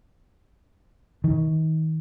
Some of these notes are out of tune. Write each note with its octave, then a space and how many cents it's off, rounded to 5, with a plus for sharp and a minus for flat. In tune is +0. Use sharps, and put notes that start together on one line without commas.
D#3 +35